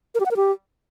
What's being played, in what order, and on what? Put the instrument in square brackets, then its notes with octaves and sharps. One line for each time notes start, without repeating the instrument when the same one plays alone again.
[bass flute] A#4
G4
F#5
A#4
G4